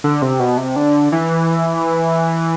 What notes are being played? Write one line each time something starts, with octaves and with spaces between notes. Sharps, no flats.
D3
C3
B2
C3
D3
E3